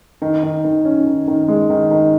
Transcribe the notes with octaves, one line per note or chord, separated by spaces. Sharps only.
D#3
D#3
D#3
C#4
D#3
D#3
G#3
D#3
D#3